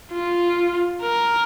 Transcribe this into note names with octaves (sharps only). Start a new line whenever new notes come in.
F4
A#4